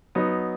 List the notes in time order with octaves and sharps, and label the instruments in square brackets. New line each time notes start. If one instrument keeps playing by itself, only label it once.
[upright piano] F#3 B3 D#4